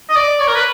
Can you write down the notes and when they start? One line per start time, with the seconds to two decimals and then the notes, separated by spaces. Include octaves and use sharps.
0.09 D#5
0.16 D5
0.40 C#5
0.48 A#4
0.56 B4